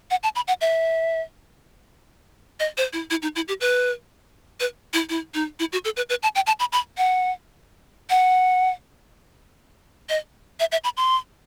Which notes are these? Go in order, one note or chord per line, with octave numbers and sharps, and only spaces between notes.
F#5
A5
B5
F#5
E5
D#5
C5
E4
E4
D#4
E4
G4
B4
B4
E4
E4
D#4
E4
F#4
A4
B4
B4
A5
G5
A5
B5
B5
F#5
F#5
D#5
E5
E5
B5
C6